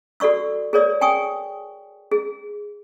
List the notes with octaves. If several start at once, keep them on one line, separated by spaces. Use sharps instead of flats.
F#4 A4 D5 C#6 E6
G#4 A#4 C#5 D5 E6
G5 G#5 C#6 D#6
G#4